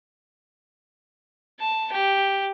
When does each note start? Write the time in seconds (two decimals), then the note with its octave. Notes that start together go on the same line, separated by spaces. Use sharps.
1.60 A5
1.92 G4